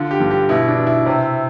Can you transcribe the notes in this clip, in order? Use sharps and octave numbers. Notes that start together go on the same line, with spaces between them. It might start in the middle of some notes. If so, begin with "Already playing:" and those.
Already playing: D3 F4
G4
G2
G4
B2 E4
D4
B2
E4
C3